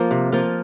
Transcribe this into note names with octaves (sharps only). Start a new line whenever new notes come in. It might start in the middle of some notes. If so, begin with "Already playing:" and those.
Already playing: F3 A#3 F4
C3
F3 A#3 F4